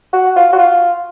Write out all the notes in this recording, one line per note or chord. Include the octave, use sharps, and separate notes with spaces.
F#4
F4
F#4
F4